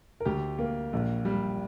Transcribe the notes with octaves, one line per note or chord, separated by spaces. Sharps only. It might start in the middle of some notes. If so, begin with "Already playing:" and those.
A#4
D2 G4
A#3
A#1
G3